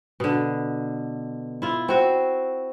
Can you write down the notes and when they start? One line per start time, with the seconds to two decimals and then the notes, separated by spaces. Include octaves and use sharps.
0.20 B2 D3
1.62 E4 F4
1.88 C4 F#4